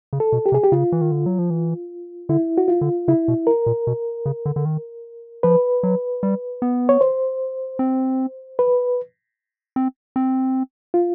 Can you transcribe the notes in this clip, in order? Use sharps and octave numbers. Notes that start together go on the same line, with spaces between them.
C#3
A4
B2
G4
C3 G#4
G4
C#3 F4
E3
D#3
D3
F#3
F3
E3
D3 E4
F#4
F4
D3
C#3 E4
B2
A#4
A#2
B2
C#3
D3
D3
D#3
F3 B4
F#3
G3
B3
C#5
C5
C4
B4
C4
C4
F4